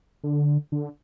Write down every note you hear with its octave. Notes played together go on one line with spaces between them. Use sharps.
D3
D3